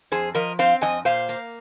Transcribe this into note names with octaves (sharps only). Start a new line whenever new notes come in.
F2 G#4 C5
F3 A#4 D#5
C4 C5 F5
F2 D#5 G#5
A#2 C5 F5
A#3